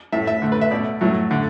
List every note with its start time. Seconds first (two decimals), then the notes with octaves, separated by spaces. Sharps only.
0.12 A2 A3 E5
0.27 E5
0.42 D3 A3
0.52 B4
0.61 E5
0.71 B2 A3 D5
1.01 A2 F#3 A3
1.31 D3 A3